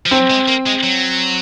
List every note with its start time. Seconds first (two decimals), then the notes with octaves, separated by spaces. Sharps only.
0.06 F3
0.11 F#3 C4
0.30 G#3
0.48 A#3
0.66 G#3
0.83 F#3